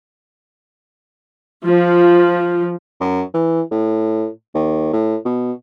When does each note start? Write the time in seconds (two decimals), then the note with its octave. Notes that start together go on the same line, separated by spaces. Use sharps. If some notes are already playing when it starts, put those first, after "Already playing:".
1.64 F3
3.00 F#2
3.34 E3
3.71 A2
4.55 D#2
4.93 A2
5.25 B2